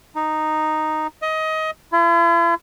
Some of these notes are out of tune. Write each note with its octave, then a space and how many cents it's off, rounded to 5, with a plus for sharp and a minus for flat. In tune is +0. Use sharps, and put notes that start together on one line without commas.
D#4 -5
D#5 +20
E4 +45